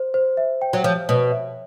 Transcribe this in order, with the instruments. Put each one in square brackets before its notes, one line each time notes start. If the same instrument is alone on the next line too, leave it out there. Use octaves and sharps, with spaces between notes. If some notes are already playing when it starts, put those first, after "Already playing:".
Already playing: [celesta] C5
C5
E5
G5
[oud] F#3
[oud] F3 [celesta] C#5
[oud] B2 [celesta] C#5
[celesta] E5